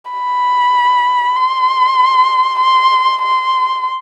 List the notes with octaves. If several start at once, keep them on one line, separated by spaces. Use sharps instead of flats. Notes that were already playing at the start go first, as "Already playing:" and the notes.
B5
C6
C6
C6